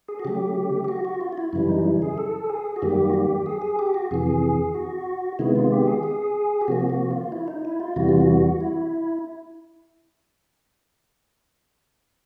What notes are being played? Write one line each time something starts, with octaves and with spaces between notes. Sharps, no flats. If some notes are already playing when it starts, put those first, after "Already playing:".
G#4
F#4
C#3 F#3 A3 G4
G4
F#4
F#4
F4
F4
E4
F#2 C#3 E3 G3 E4
D#4
E4
G#4
A4
G#4
F#4
F#2 D#3 G3 A#3 G4
F#4
G4
G#4
G#4
G4
F#4
F2 C3 E3 G#4
F#4
C3 D#3 G#3 B3 E4
F4
G4
G#4
G#4
G4
C3 F3 A#3 F#4
F#4
F4
E4
D#4
E4
F4
E2 C3 E3 G3 F#4
F4
F#4
E4